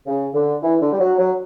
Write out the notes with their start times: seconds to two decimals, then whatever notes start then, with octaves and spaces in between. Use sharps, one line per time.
0.07 C#3
0.34 D3
0.63 E3
0.81 D3
0.92 G3
1.00 F#3
1.18 F#3